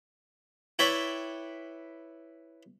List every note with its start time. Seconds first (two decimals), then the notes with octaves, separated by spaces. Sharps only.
0.79 E4 B4 C#5 D5 G5 B5